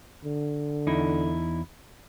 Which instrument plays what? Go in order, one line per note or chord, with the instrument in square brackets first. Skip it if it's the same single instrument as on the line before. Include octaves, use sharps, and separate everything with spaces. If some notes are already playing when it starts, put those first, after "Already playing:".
[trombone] D3
[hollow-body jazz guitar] E2 D#4 E4